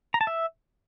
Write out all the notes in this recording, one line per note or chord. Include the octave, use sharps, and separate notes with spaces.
A#5
A5
E5